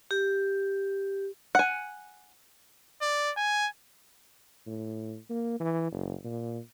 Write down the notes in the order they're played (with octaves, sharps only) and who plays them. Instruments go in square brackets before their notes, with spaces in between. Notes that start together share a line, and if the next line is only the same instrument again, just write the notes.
[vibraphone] G4
[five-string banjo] F#5 G#5
[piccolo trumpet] D5
G#5
[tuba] A2
A#3
E3
F#1
A#2